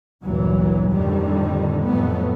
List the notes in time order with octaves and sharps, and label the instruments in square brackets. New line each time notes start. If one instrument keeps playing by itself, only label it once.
[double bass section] G1 D2 A#2 E3 F#3
F2 A2 D3 D#3 G3
F2 A2 F#3 A3 B3